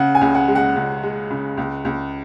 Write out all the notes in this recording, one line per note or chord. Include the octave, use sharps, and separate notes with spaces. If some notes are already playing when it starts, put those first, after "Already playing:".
Already playing: C#3 F#5
G#5
C#2
F#5
G#3
F#5
C#2
G#3
C#3
C#2
C#2